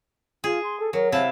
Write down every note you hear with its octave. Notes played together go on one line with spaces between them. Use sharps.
F4 G#4
C6
A4
F#3 A#4
C3 E4 F5 A5